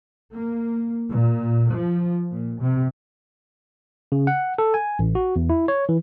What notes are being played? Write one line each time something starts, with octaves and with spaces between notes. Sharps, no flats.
A#3
A#2
F3
A#2
C3
C#3
F#5
A4
G#5
A1
F#4
E2
E4
C#5
E3